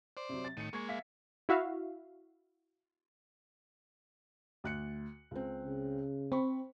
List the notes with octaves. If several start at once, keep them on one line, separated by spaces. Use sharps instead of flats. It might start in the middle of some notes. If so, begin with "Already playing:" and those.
C5 D5
C3 F#3
A6
A2 D#3 C#7 D#7
G#3 A#3 C#6 G#6 C#7
E5 F5 B6
E4 F#4 E5 F5
D2 F#6 C#7
C#2 C4
C#3
C4 B5 C#6